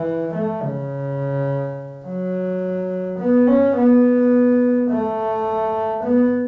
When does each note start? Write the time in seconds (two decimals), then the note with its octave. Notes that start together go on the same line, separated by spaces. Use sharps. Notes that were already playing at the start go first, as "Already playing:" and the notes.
Already playing: E3
0.34 A3
0.63 C#3
2.06 F#3
3.19 B3
3.47 C#4
3.77 B3
4.90 A3
6.04 B3